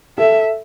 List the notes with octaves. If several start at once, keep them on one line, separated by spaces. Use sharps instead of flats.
A4 E5